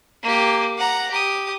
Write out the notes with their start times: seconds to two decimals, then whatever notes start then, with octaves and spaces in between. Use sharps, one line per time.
0.23 A#3 G4
0.78 F#5 A#5
1.11 G4 D#6